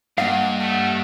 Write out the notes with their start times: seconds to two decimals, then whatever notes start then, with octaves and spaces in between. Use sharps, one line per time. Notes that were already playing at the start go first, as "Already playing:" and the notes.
0.18 G2 A#3 D#5 F5 F#5
0.60 A3 F#5